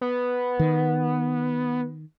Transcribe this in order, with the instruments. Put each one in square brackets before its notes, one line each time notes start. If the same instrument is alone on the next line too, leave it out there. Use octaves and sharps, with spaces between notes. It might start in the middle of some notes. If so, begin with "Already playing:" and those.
[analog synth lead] B3
[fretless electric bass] D#3